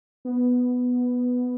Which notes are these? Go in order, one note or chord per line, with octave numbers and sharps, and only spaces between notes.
B3